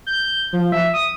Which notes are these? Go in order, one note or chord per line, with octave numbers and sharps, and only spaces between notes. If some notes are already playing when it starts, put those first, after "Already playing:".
G6
F3
E5
D#6